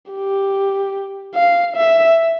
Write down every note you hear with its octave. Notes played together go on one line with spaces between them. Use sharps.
G4
F5
E5